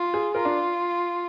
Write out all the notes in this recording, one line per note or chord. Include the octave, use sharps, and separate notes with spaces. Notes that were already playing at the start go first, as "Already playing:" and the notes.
Already playing: F4
G#4
F4 A#4
D4